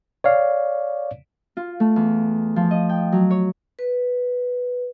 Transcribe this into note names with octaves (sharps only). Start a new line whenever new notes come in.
C#5 D5 F5
F4
A3
E2
F3
D#5
G5
F#3
C#5
B4